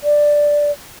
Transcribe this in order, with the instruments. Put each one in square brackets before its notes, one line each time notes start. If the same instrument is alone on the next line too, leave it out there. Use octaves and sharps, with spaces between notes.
[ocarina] D5